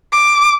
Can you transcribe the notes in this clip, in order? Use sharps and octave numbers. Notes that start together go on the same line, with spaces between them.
D6